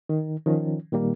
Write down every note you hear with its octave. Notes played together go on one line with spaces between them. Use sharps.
D#3
D#3 F3 C#4
A#2 D#3 G3 A#3